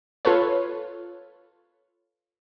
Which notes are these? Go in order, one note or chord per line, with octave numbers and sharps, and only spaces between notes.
F4 A4 B4 C#5